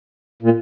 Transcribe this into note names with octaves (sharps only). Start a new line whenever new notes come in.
A#2